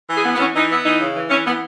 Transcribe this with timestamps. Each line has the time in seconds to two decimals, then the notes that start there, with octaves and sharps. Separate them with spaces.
0.08 E3
0.15 G#4
0.24 B3
0.34 B3
0.38 E3 C#4
0.53 E3 D#4
0.69 B3 E4
0.84 E3 D#4
0.99 C#3
1.15 E3
1.29 E3 C#4
1.45 E3 B3